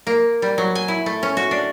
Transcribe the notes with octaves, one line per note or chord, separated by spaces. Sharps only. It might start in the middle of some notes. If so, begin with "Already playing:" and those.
A#3
G3
F#3
G#5
E4
A3
C#4
F#4
D4